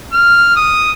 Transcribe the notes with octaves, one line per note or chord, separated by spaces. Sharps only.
F6
D#6